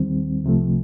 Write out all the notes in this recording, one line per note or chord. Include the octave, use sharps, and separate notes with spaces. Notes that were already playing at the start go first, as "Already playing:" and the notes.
Already playing: D#2 D#3 G3 C4
C2 C3 F3 A3